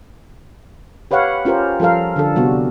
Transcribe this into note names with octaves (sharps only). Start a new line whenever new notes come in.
G4 B4 C#5 F5 F#5
C#4 F4 G4 A#4 C5
F3 G3 A4 A#4 F5
D3 D4 A4
C3 G3 B3 F#4